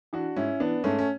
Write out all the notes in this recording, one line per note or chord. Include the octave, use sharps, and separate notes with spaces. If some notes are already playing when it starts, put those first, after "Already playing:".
E3 D4 F#4
G#2 C#4 E4
E3 B3 D4
G#2 A3 C#4
C#4